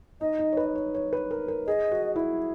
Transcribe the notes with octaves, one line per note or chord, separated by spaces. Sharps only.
D#4 D#5
D#4
C#5
B4
C#5
C#5
B4
A#4
A#4
G#4 D#5
F#4
E4